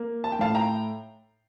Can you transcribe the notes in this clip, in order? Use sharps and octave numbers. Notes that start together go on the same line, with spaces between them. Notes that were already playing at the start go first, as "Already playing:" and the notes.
Already playing: A#3
A5
G5
A2 F5 A5
G5 A#5